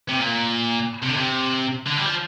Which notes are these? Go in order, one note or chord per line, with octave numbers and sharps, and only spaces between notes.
C3
A#2
C3
D3
C3
D3
G3
F3